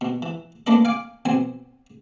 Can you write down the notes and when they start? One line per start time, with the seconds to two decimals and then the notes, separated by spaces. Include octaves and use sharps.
0.01 B2
0.22 E3
0.67 A3 A#3 C#4 D4 B4 D#5
0.85 F5 G#5 D6
1.25 B1 B3 C4 G#5